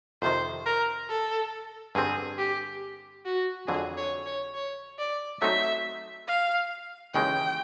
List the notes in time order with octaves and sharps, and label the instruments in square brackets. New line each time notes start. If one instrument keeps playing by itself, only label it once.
[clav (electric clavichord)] F2 C3 D#3 [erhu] C5
[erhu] A#4
A4
[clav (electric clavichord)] G2 D3 G3 C4 [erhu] G#4
[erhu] G4
F#4
[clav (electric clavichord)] F2 D3 F#3 [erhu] G#4
[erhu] C#5
C#5
C#5
D5
[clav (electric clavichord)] F#3 A3 C4 D#4 [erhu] E5
[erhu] F5
[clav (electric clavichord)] D#2 C#3 E3 G#3 [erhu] G5